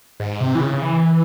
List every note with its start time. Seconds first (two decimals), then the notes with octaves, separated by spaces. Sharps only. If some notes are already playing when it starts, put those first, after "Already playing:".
0.20 G#2
0.41 C3
0.55 E3
0.61 C#3
0.82 E3